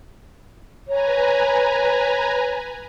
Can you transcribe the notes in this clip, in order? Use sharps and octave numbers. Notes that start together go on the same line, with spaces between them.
B4 C#5 G#5 A#5